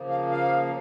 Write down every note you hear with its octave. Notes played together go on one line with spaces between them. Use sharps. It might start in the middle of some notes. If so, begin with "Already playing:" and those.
Already playing: C#3 F3 A#3
F5
F5